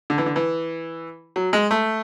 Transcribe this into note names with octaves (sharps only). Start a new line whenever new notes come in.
D3
E3
D3
E3
F#3
G#3
A3